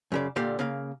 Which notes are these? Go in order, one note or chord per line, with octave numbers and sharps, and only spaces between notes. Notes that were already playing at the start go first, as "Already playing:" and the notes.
F#2 C#3 D5
A#2 D3 G4 D5 F5
C#3 A#3 F5